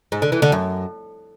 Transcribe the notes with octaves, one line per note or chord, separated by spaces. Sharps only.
G#2
D3
E3
D3
F#2